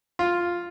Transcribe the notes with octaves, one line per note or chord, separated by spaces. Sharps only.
F4